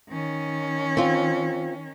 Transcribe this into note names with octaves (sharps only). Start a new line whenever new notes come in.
D#3 C#4
C4 F4